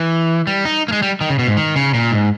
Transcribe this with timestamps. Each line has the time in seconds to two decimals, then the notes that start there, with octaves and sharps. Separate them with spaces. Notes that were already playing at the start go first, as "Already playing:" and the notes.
Already playing: E3
0.47 G3
0.65 D#4
0.88 A#3
0.92 G#3
1.02 G3
1.21 D#3
1.30 C#3
1.39 B2
1.47 G#2
1.57 D#3
1.76 C#3
1.94 A#2
2.12 G#2